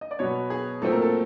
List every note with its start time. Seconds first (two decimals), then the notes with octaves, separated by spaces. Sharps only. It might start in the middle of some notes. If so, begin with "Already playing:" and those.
0.01 D#5
0.11 D5
0.19 B2 F#3 B3 C#5
0.50 G#4
0.82 A#2 F#3 A3 C4 A4
0.92 A#4
1.02 A4